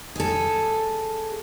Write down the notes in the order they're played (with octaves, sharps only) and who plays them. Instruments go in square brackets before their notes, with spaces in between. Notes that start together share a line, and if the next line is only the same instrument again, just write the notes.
[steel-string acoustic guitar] G#4 A4